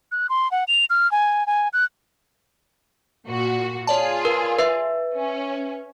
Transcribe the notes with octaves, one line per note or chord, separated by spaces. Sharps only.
F#6
C6
F#5
F7
F6
G#5
G#5
F#6
A#2 F#4
F4 G#4 C#5 D5 A5
A#4 B4
B4 E5
C#4